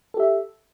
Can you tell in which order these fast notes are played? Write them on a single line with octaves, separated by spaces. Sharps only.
A4 G4 E5